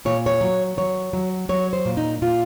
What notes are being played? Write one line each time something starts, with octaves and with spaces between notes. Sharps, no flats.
A#2 C#5
C#5
F#3
F#3 C#5
F#3
F#3 C#5
C5
A#2
D#4
A#2 F4